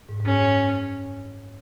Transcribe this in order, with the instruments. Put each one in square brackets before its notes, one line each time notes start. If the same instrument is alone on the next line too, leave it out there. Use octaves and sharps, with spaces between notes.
[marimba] G#2
G#2
[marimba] F#2 [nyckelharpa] C#4
[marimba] G#2